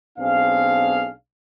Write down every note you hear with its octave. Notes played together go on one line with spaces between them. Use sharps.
B1 B3 C4 D4 G#4 F5